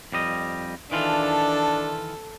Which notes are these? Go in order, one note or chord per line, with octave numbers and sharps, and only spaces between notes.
F2 G3 D#5
D#3 E3 D4 F4 A4